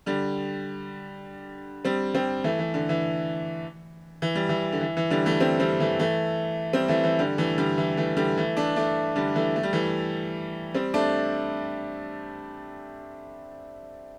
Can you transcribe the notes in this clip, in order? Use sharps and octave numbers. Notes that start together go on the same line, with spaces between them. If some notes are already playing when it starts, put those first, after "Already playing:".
D3 G3
G3 C4
G3 C4
E3 A3
E3
D3
E3
E3
G3
E3
D3
E3
E3
D3 G3
E3 A3
G3 C4
G3 C4
E3 A3
E3 A3
G3 C4
E3 A3
E3
D3 G3
E3 A3
D3 G3
E3
E3 A3
D3 G3
E3 A3
A3 D4
A3 D4
D3 G3
E3 A3
A3
G3
E3 A3
G3 C4
A3 D4